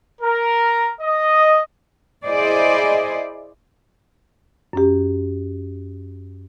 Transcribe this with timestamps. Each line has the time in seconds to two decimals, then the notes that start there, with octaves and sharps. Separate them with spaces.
0.22 A#4
1.01 D#5
2.25 E4 G#4 C5 D5 D#5
4.73 F#2 C#4 G4